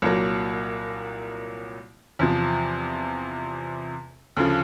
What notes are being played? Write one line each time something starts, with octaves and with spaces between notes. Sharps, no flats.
C2 A#2 F#3 A#3
E2 C3 F3
D2 C#3 F3